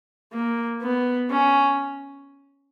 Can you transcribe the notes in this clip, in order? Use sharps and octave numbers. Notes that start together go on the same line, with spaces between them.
A#3
B3
C#4